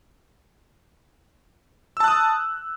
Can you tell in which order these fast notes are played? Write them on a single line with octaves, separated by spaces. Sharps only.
E6 A5 F#6 D#6